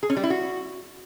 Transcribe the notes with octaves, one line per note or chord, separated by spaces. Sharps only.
G#4
C#4
G3
E4
F#4